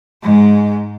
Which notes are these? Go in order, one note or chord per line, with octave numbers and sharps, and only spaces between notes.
G#2 G#3